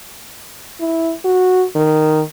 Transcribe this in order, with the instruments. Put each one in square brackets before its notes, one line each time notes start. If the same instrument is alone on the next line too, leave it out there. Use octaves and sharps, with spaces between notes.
[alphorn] E4
F#4
D#3